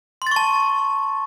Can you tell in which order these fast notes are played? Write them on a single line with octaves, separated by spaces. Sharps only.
C6 A6 C#6 A5